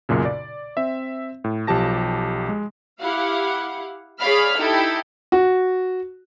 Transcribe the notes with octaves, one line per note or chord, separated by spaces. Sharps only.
B1 F#2 A#2 C#3
D5
C4 E5
A2
B1 F3 G4 A5 A#6
G#3
E4 G4 F5 F#5
G#4 C#5 D5 F5 B5 F6
D#4 E4 G4 A4
F#4